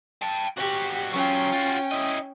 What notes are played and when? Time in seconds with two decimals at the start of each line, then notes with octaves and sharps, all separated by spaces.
0.22 G5 A5
0.58 G#2 F#4 G4
1.14 F#3 C#4 F4 G5
1.53 F4 F#4
1.92 E4 D#5